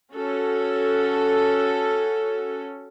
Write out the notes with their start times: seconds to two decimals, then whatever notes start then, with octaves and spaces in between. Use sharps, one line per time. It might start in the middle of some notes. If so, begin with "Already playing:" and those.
0.14 C#4 F#4 A4